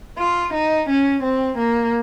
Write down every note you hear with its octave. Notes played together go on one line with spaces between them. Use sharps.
F4
D#4
C#4
C4
A#3